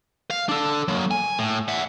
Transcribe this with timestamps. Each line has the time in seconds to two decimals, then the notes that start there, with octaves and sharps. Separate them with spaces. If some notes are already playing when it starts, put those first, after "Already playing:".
0.30 F5
0.49 D4 A4
0.88 F#3 A#3
1.11 G#5
1.39 A2
1.68 E5 F#5